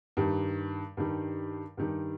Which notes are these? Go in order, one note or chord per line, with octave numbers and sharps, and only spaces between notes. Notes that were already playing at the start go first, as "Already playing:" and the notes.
G2 D#3 G3
G2 D#3 G3
G2 D#3 G3